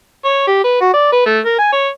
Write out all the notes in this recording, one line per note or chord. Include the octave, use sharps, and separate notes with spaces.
C#5
G4
B4
F#4
D5
B4
A3
A#4
G#5
C#5